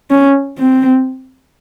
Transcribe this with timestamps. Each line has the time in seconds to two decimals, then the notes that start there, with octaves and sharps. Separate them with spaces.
0.10 C#4
0.58 C4